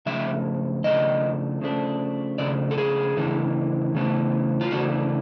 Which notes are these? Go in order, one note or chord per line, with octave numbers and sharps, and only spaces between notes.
C#3 F3 A3 D4 E5
C#3 F3 A3 D4 D#5
C#3 F3 A3 D4
C#3 F3 A3 D4 D5
A4
G#4
C#3 E3 A3 D4
C#3 E3 A3 D4
F4
C#3 E3 A3 D4 F#4